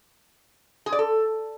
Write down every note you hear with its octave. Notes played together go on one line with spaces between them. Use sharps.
G#4
D5
A4